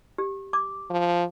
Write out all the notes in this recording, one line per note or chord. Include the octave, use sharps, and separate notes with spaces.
G4
D6
F3